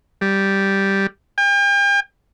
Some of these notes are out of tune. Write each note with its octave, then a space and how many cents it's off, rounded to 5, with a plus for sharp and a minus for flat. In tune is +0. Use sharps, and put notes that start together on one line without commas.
G3 -5
G5 +40